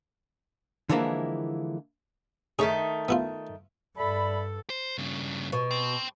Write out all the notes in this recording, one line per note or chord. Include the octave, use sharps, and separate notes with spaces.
D3 E3 F3 G#3 A#3 E4
D#3 A3 D#4 G#4 C#5
B3 E4 F4
G2 A4 D5 E5 B5
C5
G2 C#3
B2
G5 C6